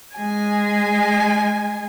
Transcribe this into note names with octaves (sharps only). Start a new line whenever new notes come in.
G#3 G#5